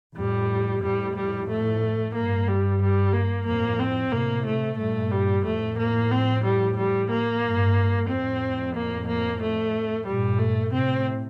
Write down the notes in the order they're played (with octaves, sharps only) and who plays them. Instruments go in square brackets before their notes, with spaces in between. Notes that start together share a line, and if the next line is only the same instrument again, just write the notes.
[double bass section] F2 A2 [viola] G3
[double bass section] F2 A2 [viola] G3
[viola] G3
A3
[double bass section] G2 [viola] A#3
[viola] G3
G3
A#3
[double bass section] F2 A2 [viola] A#3
[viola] C4
[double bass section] A2 C3 [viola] A#3
[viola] A3
[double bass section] G2 A#2 [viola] A3
[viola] G3
[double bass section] F2 A2 [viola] A3
[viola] A#3
C4
G3
G3
A#3
[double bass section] G2
[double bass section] F2 A2 [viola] C4
[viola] A#3
A#3
A3
[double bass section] G2 A#2 [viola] G3
[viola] A3
[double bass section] A2 C3 [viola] C4